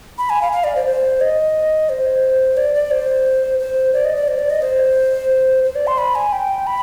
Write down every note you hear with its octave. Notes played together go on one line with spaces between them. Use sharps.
B5
G#5
F5
F5
D5
C5
C5
D#5
C5
D5
D5
C5
C5
D5
D#5
D5
C5
D5
D#5
C5
C5
D5
C6
B5
G#5
G5
B5